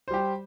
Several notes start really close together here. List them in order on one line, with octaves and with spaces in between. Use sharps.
C5 G3 G4